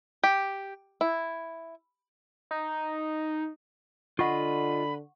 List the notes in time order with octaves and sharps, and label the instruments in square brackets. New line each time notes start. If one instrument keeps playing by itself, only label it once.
[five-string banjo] G4
E4
[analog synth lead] D#4
[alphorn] D3 [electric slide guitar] F4 D#5 [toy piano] F#5 C#6 [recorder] B5